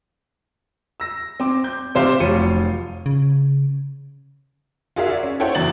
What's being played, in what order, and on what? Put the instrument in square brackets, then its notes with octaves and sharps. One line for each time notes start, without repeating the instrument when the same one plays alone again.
[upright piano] E6 A#6
C4 D6
G6
C3 C5 F5 C6 D6
F1 F#3 F4 C#5 C#7 D#7
[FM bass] C#3
[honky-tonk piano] F4 F#4 G#4 A#4 E5 F5
D5
C#4
E4 A4 C5 C#5 F#5 G5
F#1 E2 F#3 D4 A6 F#7